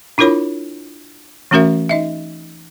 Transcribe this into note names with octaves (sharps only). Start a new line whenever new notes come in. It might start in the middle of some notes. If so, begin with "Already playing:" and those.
D4 E4 F4 A#4 C#5 B5
E3 A3 C#4 F#4 A#4 E5
D#4 D#5 E5